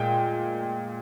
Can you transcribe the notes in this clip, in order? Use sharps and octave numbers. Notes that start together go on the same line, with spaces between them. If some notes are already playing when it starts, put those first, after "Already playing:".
Already playing: A#2 G#3 G5